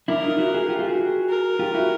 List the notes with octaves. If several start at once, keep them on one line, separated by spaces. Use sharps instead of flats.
D4 E4 A#4
D#4 F4
E4 F#4
F#4 G#4
F4 G4
F4 G4
F#4 G#4
A#4
F4 G4
E4 F#4